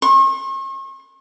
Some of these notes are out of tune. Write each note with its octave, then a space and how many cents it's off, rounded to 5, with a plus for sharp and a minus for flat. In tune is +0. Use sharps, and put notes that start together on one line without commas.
C#6 -45